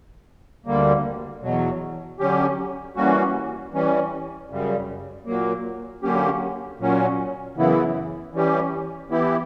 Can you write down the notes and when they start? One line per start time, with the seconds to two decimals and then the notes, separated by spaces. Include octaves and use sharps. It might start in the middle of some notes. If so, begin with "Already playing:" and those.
0.66 D2 D3 G3 A#3
1.43 E2 B2 F#3
2.19 D3 F#3 C#4 G4
2.96 E3 G3 A#3 C#4 F#4
3.73 E3 G3 C#4
4.50 F#2 C#3 G3
5.26 A#2 F#3 A#3
6.03 D3 F#3 A#3 C#4 G4
6.80 A#2 F#3 C#4
7.56 F#2 C#3 E3 B3 E4
8.33 E3 G3 C#4 G4
9.10 E3 B3 E4 G4